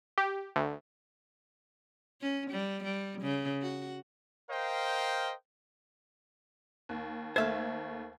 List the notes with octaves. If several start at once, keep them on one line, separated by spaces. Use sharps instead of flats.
G4
D2
C#4
G3
G3
C#3
F#4
A#4 C5 D#5 F5 G5
D#2
D#2 A3 C5 E5 F5 G#6